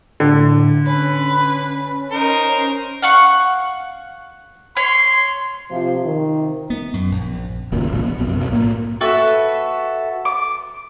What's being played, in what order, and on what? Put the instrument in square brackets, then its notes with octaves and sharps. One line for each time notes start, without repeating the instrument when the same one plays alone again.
[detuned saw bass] A2 [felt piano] D3
[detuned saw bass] C#4 [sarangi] B4
[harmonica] D#4 A#4 [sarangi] C5
[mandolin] F5 F#5 C#6
[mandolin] C#5 [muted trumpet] C6
[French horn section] C3 F3
C3 D#3
[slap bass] B3
F#2
A#1
[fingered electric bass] D#1 G#1 A#2 C#3
C2 A#2 C#3 F3
B3
B1 F#2 C3
B1
A2 A#3
[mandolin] F#4 A4 B4 E5
D6